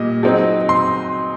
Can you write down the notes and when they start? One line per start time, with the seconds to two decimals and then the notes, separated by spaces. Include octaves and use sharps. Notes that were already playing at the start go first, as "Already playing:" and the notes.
Already playing: A#2 G3 A#3 D#5
0.23 F#3 C4 D#4
0.69 C6